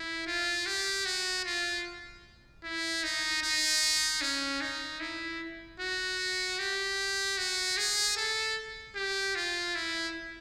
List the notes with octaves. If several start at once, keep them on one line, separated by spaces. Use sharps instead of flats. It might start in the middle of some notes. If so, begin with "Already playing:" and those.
Already playing: E4
F4
G4
F#4
F4
E4
D#4
D#4
C#4
D#4
E4
F#4
G4
F#4
G#4
A4
G4
F4
E4